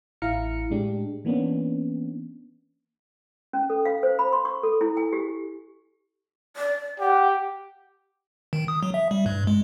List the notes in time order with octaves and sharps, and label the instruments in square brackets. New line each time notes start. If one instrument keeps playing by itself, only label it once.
[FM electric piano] A1 E4 F5 A#5 F6 C#7
A2 G#3 D4 G4
E3 A#3 B3 C#4 D4
[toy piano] C#4
A4
F5
C5
B5
C6
C#6
A4
E4
G#5
G4
[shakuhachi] D5
[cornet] G4 [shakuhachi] F#5
[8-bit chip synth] D#3
D#6
F#3
E5
G3
G2
G#3